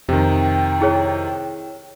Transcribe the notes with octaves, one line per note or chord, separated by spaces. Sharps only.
F2 C3 D#3 G5
E4 G#4 C#5